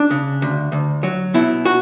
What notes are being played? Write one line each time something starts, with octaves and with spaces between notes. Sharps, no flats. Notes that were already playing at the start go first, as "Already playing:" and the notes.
Already playing: D4
C#3
D2
D2
F#3
B2 E4
F#4